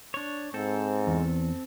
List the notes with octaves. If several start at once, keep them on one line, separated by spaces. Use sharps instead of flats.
D4 C#5
G#2 C4 A4
E2